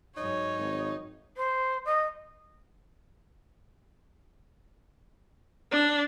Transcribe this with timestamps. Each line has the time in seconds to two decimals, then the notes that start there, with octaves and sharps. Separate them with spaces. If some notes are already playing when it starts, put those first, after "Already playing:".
0.17 G#2 F#3 D#4 C#5
0.59 G#1
1.37 C5
1.85 D#5
5.72 D4